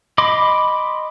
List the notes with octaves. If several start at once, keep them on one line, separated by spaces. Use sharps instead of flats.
D#5 B5 C6 D6